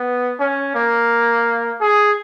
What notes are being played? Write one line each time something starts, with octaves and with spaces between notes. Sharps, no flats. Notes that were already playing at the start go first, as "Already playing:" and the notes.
Already playing: B3
C#4
A#3
G#4